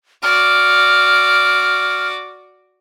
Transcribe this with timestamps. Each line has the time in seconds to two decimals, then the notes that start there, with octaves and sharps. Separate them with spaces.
0.23 F#4 D5 F6